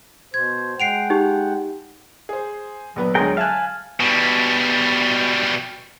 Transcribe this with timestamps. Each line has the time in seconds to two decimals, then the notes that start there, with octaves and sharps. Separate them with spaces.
0.34 B2 C5 G#6
0.80 G#3 F#5 G5 C7 D7 F7
1.10 D#4 G4
2.29 G#4 C5
2.96 A#1 F#3 B3 B4
3.15 D2 G#3 G#4 A#4 G5
3.37 E5 F5 G#5 A5 F#6
4.00 B2 G3